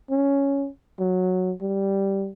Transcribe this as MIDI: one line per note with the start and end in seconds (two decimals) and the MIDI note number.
0.10 0.68 61
1.00 1.53 54
1.62 2.31 55